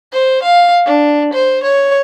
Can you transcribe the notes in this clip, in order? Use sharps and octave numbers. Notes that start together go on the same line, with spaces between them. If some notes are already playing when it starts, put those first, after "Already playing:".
C5
F5
D4
C5
C#5